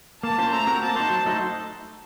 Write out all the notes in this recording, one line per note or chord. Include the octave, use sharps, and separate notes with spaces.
A#3 A5
C#4 F4 C5
A3 A#5
C4 F#4 A#4
A#3 A5
D#4 F#4 C5
F#3
A3 D#4 F#4 C5